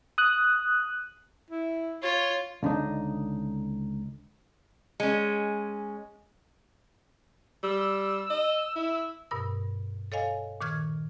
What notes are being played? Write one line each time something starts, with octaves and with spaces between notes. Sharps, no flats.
D#6 F#6
E4
F4 C#5
C#2 D3 D4 D#4
G#3 C#4
G3 E6
D#5
E4
G2 B2 A#4 E6
A4 C#5 D#5 F5 G#5
A#2 D#3 C#6 F6 G#6